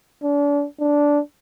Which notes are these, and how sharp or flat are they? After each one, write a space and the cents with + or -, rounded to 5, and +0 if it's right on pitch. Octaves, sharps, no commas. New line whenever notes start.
D4 -35
D4 -10